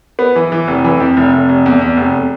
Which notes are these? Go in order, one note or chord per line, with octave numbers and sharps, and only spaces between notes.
B3
E3
E3
F1
E3
F2
F1
F1
F1
E2
E2
F1